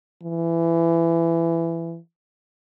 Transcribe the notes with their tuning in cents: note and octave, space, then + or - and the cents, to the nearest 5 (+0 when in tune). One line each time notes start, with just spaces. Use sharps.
E3 +20